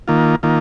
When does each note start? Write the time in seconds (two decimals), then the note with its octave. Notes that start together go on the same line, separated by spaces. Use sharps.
0.08 D#3 A#3 F4
0.43 D#3 A#3 F4